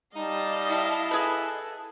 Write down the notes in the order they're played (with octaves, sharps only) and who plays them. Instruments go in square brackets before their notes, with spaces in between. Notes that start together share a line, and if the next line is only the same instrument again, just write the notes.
[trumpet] G3 [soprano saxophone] D#4 [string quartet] D#5 F5 A5
[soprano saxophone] E4
[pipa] G#4 B4 [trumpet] A4